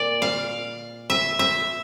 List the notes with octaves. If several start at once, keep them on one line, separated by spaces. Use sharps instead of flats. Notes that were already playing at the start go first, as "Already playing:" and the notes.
Already playing: A#2 A#3 D5
F5
E5
E5